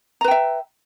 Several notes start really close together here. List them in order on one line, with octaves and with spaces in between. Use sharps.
A#5 B4 G5 E5